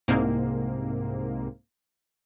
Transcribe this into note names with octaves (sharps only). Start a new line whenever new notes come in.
C2 G#2 C3 A#3